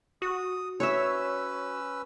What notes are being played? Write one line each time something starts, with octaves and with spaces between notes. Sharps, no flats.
F#4 D#6
C#4 B4 C#5 E5 E6